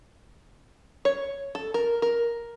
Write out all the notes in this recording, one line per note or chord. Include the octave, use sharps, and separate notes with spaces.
C#5
A4
A#4
A#4